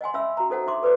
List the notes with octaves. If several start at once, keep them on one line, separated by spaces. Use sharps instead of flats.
D#5 F#5 G#5 C6
C#4 E5 F5 B5 E6
F#4 A#5
D#4 A4 C5 F#5 A5
D4 D#4 E5 C6 D6
A4 B4 C5 D5 D6